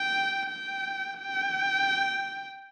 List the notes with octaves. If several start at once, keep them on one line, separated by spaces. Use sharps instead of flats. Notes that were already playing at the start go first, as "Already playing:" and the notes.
Already playing: G5
G5
G5